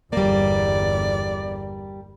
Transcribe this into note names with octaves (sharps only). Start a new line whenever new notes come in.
G1 E2 G3 A#3 D5